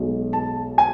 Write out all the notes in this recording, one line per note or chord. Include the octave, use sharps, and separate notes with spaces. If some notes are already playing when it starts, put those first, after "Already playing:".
Already playing: B1 B2 G#3
A5
G#5